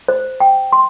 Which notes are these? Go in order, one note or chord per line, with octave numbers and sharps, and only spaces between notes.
C5
G5
C6